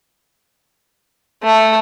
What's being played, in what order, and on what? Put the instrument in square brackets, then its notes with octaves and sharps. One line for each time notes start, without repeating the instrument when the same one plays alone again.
[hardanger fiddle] A3